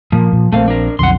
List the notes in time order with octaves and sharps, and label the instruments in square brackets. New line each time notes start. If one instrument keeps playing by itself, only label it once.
[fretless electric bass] A#2 A#3 [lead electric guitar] F3
[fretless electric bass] A#2
[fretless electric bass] A#1 A#3 C4 [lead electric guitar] A3 F5
[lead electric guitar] D4 A#4
[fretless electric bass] B1 F2 D3 [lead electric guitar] F#5 C6